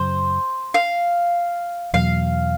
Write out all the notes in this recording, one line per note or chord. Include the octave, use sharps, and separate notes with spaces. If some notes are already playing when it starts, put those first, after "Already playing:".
Already playing: F#2 C#3 F#3 C5
F5
E2 B2 F#3 F5